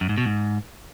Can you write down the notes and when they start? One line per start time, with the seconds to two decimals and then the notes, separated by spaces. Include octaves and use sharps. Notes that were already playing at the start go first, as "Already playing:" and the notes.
0.01 F#2
0.09 G#2
0.18 B2
0.26 G#2